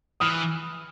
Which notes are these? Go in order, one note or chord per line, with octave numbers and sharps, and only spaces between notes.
E3 D#6 F6